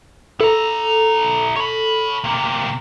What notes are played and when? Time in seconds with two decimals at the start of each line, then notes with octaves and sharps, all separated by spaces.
0.41 E4 A4 A#5
1.56 C#5 B5
2.24 C3 A#3